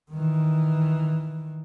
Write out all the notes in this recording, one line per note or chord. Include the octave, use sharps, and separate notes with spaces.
D#3 E3